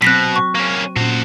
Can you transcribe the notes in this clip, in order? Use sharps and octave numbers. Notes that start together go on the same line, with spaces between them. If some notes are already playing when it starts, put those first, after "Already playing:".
B2 F#3 C4 F#6 A#6 B6
C#6
A#3 C#4
A#2 C#4 F#4 C5